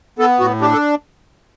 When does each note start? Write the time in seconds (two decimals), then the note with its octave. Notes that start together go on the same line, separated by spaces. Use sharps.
0.19 B3 A4
0.40 A2 F#4
0.61 D4 G4
0.72 A4